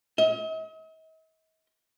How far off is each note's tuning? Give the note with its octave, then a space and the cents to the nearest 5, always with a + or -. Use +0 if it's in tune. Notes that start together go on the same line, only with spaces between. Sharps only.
D#5 +45